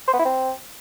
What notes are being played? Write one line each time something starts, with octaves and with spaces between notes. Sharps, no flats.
C5
B3
E4
C4